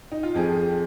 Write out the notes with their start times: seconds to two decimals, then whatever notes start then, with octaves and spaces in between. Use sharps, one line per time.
0.12 D#4
0.23 F4
0.34 F2 F3 C4 G#4